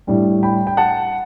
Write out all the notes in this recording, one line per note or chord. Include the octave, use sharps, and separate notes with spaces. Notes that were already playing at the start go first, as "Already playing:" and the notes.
A2 G3 D4
G5 B5
G5
F#5 A5